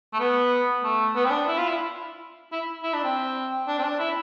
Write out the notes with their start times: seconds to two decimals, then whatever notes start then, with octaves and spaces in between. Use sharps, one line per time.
0.13 A3
0.20 B3
0.83 A3
1.15 B3
1.24 C4
1.31 D4
1.47 E4
1.57 F4
1.67 E4
2.52 E4
2.83 E4
2.93 D4
3.04 C4
3.68 D4
3.79 C4
3.84 D4
3.99 E4